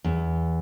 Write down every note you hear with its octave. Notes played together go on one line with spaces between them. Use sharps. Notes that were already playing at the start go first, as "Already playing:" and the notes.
E2